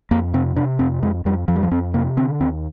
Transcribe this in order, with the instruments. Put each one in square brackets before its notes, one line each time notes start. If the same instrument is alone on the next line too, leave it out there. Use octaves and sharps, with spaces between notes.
[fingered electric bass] F2 A#3
C3 C4
C3 D4
F2 C4
F2 G#3
F2 G3
F2 F3
G3
F3
F2 C4
C3 A#3
D3 C4
D#2 C4